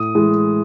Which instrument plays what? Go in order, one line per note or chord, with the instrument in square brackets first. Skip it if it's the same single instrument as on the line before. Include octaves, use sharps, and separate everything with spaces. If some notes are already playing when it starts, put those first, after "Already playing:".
Already playing: [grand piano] A2 D#6
E3 G#3